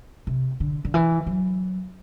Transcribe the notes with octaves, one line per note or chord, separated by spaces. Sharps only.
C3
D3
D3
E3
F#3